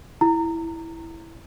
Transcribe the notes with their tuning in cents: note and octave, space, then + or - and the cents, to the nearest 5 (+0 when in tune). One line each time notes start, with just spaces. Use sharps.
E4 +0 A#5 -20